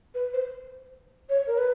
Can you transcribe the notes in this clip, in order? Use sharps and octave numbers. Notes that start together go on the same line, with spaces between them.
B4
C5
C#5
A#4
B4